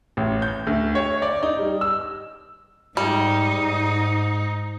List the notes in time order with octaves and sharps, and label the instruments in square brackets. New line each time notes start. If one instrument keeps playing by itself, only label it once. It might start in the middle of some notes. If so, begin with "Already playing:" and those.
[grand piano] A1
G6
D2
C#5
D5
D#4
G3
E6
[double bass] G#2 [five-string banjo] G3 [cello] D#4
[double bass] G#2